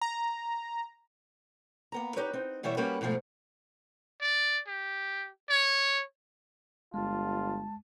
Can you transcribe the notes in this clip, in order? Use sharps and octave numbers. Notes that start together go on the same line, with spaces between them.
A#5
A#3 B3 A#5
D#4 G4 B4 C#5
C4 D#4
B2 E3 G3 B3 C#5 E5
G3 A#3 C#4 F#4 G4 B4
G#2 B2 F3 G3 A3
D5
G4
C#5
G1 G#3 F4 A5